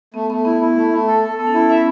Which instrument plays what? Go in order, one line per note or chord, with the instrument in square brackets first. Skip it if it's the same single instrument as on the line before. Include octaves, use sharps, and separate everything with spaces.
[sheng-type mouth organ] A3 [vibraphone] B3
[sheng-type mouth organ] A3 [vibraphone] B3
[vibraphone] B3 [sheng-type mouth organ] E4
[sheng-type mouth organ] E4
A3
A3
A4
A4
[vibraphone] B3 [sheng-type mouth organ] A4
[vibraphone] C#4
[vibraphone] B3 [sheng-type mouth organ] E4
[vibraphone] C#4 [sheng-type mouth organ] E5